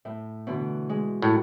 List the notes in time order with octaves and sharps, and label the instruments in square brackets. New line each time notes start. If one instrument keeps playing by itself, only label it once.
[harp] A2 A3
B2 D3 E3
G#3
[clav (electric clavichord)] A2 [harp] F#4